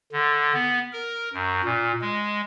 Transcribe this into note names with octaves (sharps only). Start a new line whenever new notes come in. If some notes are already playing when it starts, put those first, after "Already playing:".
D3
B3
A#4
F#2
A#2
G#3